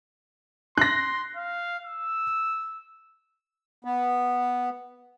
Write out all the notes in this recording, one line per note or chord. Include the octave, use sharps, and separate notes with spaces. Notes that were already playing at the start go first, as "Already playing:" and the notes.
C6 F#6 A#6
F5
E6
B3